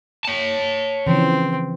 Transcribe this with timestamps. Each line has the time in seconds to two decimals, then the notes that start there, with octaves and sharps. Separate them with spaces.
0.25 C#5 A5
1.07 C#3 E3 F3 C4